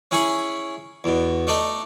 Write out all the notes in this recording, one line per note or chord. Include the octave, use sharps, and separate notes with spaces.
C#4 E4 G#4 G#5 B5 C#6
E2 B2
A3 D4 D#4 D#5